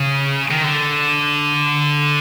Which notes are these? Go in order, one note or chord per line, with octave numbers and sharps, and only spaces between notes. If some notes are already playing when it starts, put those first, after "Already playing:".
Already playing: C#3
D#3
D3